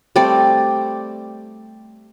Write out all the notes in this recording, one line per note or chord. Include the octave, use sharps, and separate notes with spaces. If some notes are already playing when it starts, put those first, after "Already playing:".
G3 A3 C4 D5